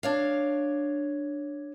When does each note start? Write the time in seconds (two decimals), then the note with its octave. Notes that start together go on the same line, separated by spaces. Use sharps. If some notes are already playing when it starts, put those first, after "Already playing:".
0.03 D4 C#5 F5